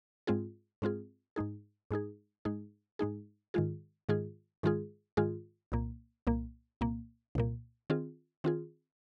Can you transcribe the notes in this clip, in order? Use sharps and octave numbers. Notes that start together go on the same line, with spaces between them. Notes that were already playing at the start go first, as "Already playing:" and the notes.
G#2 G#3 C4 F4 G#4
G#2 G#3 C4 F4 G#4
G#2 G#3 D#4 G#4
G#2 G#3 D#4 G#4
G#2 G#3 D#4 G#4
G#2 G#3 D#4 G#4
G#2 D#3 G#3 F4 G#4
G#2 D#3 G#3 F4 G#4
G#2 D#3 G#3 F4 G#4
G#2 D#3 G#3 F4 G#4
C2 A#2 A#3
C2 A#2 A#3
C2 A#2 A#3
C2 A#2 A#3
D#3 C4 F4 G#4
D#3 C4 F4 G#4